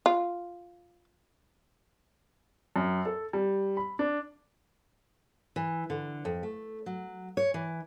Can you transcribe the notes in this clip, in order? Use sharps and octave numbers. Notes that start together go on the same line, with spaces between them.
F4
F#2
A4
G3
B5
D4
E3
D3
F2
A3
F#3
C#5
E3